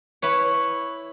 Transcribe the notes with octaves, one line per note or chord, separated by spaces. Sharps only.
E4 B4 C#5